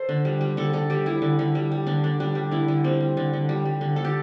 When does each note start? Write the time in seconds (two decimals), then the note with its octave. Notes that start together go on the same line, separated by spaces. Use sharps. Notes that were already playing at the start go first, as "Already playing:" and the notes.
Already playing: A4 C5
0.09 D3
0.25 G3
0.41 G3
0.57 D3 A4
0.73 D3 A4
0.90 G3 G4
1.06 G3 E4
1.22 D3
1.39 D3
1.55 G3
1.72 G3
1.87 D3 D4
2.04 D3 D4
2.20 G3 D4
2.35 G3
2.51 D3 E4
2.68 D3
2.84 G3 C4
3.01 G3
3.17 D3
3.33 D3
3.49 G3
3.65 G3
3.81 D3
3.96 D3 A4
4.05 G4